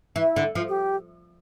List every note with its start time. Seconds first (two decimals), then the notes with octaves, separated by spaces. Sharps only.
0.16 E3 E4
0.36 D3
0.55 F3
0.69 G4